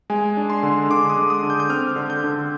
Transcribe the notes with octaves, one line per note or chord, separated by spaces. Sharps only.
G#3 G#5
D4
C6
D3
D3 D6
D#6
G#3
D#6
D3
G6
G6
C4 F6
D3
G6
D3